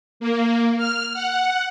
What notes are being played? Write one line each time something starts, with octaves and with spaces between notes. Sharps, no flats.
A#3
F6
F#5